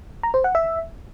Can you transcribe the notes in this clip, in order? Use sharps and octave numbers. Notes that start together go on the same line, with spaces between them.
A#5
C5
F#5
E5